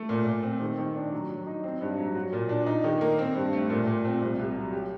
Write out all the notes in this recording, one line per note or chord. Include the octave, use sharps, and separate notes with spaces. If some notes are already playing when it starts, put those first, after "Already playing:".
Already playing: A3
A#2
A#2
C4
D#3
D#3
D4
F#3
F#3
D#4
C4
G2
F#3
F#4
A#2
D4
D#4
D#3
A#3
C4
G2
A3
A#2
A#2
C4
C2
C2
F#3
G4